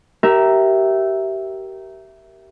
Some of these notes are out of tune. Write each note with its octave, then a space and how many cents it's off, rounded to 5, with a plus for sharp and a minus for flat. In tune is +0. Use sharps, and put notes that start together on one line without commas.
G4 -25 A#4 +0 E5 +0